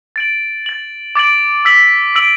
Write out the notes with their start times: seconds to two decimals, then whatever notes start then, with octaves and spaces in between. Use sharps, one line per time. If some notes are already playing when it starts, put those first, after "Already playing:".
0.16 A6 D7 F#7
0.66 A6 F#7
1.15 D6 A6 D7 F#7
1.65 E6 B6 F#7
2.15 E6 B6 D7 F#7